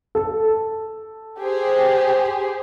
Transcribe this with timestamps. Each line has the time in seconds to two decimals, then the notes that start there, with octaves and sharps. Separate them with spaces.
0.15 A4
1.40 G4 G#4 C5